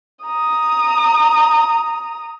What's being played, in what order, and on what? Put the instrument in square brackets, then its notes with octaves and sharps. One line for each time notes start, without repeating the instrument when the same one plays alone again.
[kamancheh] A#5 D#6